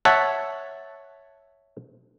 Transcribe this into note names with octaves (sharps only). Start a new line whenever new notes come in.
C#5 E5 F#5 A5